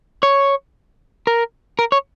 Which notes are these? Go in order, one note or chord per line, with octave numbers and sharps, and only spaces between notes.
C#5
A#4
A#4
C#5